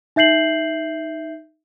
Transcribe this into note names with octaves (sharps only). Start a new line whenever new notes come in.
D#4 E5 G6 C7 F#7